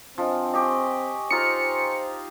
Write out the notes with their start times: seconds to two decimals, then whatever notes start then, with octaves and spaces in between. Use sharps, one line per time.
0.18 F3 C4 D4 D#5 G#5
0.54 G4 D#5 G#5 C#6
1.31 D#4 F4 C5 A#5 C#7